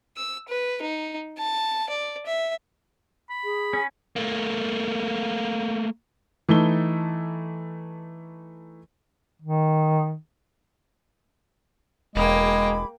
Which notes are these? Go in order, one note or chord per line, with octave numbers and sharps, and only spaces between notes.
E6
B4
D#4
A5
D5
E5
B5
G#4
C#4
A3 A#3
E3 A3 D#4 A5 G7
D#3
E1 G#3 A#3 G#4 G5 B5 D6